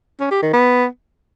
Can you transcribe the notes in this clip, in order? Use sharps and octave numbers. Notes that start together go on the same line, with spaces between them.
C#4
G4
D#3
B3